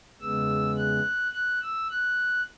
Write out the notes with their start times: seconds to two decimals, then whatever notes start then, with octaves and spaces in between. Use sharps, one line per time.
0.21 E2 C#3 G#3 B3 E6
0.77 F#6
1.33 F#6
1.62 E6
1.90 F#6